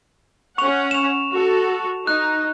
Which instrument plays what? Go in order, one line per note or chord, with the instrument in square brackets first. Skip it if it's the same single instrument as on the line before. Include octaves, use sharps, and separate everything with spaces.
[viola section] C#4 F#5 [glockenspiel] C#6 F7
[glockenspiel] E7 F7
[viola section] F#4 A4
[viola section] D#4 [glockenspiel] F#6